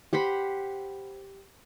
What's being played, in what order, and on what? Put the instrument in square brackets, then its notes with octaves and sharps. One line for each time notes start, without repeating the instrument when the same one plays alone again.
[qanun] G4 C5 F#5 B5